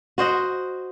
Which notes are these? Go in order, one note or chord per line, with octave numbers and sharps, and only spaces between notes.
F#4 C5 D#5 F#5